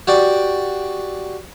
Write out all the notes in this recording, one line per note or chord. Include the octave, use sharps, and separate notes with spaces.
F#4 G4 D5